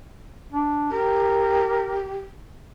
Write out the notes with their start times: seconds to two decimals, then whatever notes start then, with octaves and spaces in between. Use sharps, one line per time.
0.52 D4
0.92 G4 A#4